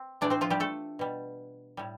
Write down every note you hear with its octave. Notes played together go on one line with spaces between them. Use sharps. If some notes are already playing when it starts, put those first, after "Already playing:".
Already playing: C4
A2 E3 A3 D4 D5
C4 C5
F3 F4
G3 G4
A3 A4
B2 G3
A2 G3